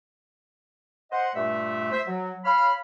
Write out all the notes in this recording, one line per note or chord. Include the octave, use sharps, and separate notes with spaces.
C5 D#5 F#5
G2 A#2 A3 E5
C5 E5
F#3
C#5 F5 B5 F6